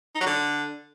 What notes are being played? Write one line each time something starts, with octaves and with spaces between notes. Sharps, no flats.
D#4
F#3
D3